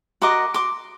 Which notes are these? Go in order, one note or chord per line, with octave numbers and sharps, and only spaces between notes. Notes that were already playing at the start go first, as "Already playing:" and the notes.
F#4 A#4 D#5 C6 D6
C6 D6